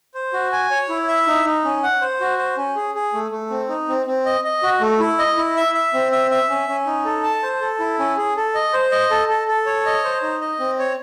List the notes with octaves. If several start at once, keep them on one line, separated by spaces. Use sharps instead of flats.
C5
F#4
G#5
C#5
E4
E5
D#4
D#4
C#4
F#5
C5
F#4
C5
C#4
G#4
G#4
A3
A3
C4
D#4
C4
C4
D#5
D#5
F#4
A3
E4
D#5
E4
E5
E5
C4
E5
E5
C#4
C#4
D#4
A4
A5
C5
A4
E4
C#4
G#4
A4
D#5
C5
D#5
A4
A4
A4
C#5
D#5
C5
D#4
D#5
C4
C#5